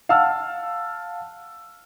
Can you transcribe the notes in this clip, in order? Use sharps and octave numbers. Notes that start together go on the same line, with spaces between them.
F5 F#5 A5 E6 F6